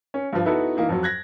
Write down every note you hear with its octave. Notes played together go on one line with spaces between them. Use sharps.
C#4
G2 F3
B3 D#4 E4 F#4 A4 B4
E3 A#3 D#4
F2 F#3
F#6 G#6 A#6